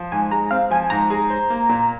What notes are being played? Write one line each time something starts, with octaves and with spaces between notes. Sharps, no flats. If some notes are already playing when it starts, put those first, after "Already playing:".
Already playing: F3
G#2 G#5
G#3 A#5
C4 F5
F3 G#5
G#2 A#5
G#4
C5
A#3
A#2